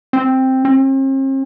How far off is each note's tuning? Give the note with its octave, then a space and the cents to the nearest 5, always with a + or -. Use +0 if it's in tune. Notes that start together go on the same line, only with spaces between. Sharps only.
C4 +5
C4 +45